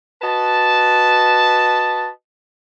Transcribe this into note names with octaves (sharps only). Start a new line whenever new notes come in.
F#4 B4 D#5 A5